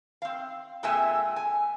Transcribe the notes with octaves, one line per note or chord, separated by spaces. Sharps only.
C4 F5
A#2 G#3 C4 A4 E5 G#5
G#5